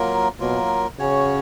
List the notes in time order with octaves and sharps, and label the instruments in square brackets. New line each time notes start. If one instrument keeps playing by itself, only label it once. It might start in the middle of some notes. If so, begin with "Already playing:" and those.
Already playing: [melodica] F#3 A#3 F4 A#4
[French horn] B2 [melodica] F#3 A#3 F4 A#4
[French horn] C#3 [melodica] C#4 F#4 C#5